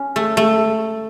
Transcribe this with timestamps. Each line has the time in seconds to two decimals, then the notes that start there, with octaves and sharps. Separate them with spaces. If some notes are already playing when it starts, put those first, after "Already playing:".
Already playing: C#4
0.16 A3
0.37 A3